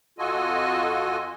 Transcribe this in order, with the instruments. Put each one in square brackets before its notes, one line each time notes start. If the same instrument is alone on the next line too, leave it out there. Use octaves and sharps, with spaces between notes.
[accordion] F2 F4 F#4 A4 D#5 G#5